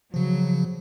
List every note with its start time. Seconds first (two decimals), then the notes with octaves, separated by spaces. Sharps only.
0.14 C#3 F3 F#3